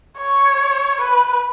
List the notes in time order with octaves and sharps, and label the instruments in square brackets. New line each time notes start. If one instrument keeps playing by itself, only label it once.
[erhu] C#5
B4